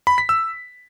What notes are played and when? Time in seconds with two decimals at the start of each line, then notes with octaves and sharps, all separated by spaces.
0.07 B5
0.18 B6
0.29 E6